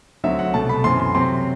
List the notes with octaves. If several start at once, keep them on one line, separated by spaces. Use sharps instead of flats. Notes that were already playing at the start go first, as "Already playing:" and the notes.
D2 D3 F#3 C4 E5
F#5
C2 B2 A3 A5
B5
F#2 E3 A3 C4 C6
C6
C3 F#3 C4 C6